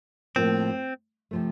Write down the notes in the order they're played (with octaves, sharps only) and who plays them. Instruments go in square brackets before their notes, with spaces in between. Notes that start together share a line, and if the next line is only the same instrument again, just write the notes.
[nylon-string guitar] A2 F3 A#3 F4 [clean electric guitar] C4
[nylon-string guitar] C3 F3 A3